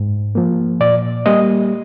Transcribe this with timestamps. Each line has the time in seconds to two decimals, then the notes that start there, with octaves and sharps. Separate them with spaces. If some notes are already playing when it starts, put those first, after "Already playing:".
Already playing: G#2
0.35 F3 A#3
0.80 A#2 D5
1.26 G3 A#3 D#5